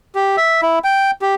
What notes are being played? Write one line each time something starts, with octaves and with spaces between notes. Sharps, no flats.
G4
E5
E4
G5
G4